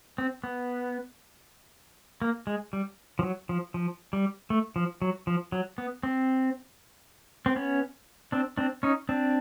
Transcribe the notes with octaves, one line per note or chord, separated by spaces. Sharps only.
C4
B3
A#3
G#3
G3
F3
F#3
F3
F3
G3
A3
F3
F#3
F3
F#3
B3
C4
C4
B3 C#4
C4 D4
C4 D4
C#4 D#4
C4 D4